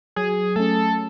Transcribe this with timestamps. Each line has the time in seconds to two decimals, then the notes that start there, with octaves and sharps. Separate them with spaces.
0.16 F#3 G#4
0.56 A3 C#4 A4